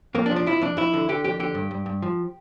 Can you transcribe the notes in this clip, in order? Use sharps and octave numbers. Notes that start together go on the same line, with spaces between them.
F2 A#3
D4
F3
D4
F2 E4
F2 D4
F2 E4
D3
D3 G4
F2 G4
D3 G4
G2
G2
G2
F3